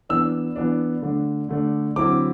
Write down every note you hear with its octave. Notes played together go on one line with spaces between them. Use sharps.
E3 B3 D4 E6
E3 B3 D4
D3 A3 D4
D3 A3 D4
D3 F#3 C4 E4 D6